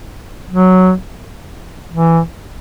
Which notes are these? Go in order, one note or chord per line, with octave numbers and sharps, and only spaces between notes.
F#3
E3